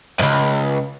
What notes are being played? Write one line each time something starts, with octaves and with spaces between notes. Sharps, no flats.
C#2 F#2